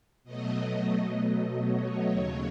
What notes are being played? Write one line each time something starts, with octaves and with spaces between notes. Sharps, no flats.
B2 F#3 A3 D#5
D#5
C#5
D#2 C#3 F#3 C#5